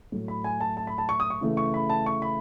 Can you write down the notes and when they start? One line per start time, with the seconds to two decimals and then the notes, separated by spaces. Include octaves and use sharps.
0.12 A2 F#3 A3
0.28 B5
0.44 G#5
0.61 A5
0.77 A5
0.87 B5
0.98 A5
1.09 C#6
1.20 D#6
1.30 C#6
1.41 C#3 E3 A3
1.57 C#6
1.74 B5
1.90 A5
2.06 C#6
2.22 B5